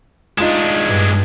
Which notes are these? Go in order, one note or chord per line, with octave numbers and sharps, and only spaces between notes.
G#3 D4 D#4 F4 E7
G2